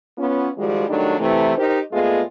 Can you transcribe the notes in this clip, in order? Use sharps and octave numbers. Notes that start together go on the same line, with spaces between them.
B3 C#4 F4
D#3 F3 G3 G#3 F4 F#4
D#3 F#3 G3 A3 D4 D#4
C3 E3 A3
D#4 G4 A#4 C5
A#2 G#3 A3 B3 F4 G#4